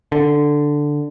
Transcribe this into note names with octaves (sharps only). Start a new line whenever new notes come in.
D3